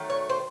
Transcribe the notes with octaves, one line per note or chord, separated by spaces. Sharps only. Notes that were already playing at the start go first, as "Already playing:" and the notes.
Already playing: D#3 F#3 A3
C#5
C5